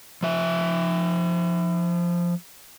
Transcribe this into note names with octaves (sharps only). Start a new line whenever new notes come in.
F3 E5